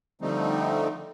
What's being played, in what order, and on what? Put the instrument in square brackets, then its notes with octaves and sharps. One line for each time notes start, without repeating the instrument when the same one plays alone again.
[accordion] D3 F3 G3 A3 C4 D#4